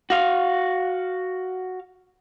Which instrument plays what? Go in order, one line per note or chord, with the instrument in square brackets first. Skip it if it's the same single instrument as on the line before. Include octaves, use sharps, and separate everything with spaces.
[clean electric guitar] F#4 F5